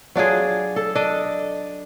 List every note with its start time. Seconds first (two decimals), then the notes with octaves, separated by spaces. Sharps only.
0.15 F#3 D4 F4 G#4
0.76 A4
0.95 D4 D#5